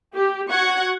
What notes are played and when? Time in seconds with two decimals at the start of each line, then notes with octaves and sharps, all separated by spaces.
0.15 G4
0.50 F#4 F#5 C#6 G#6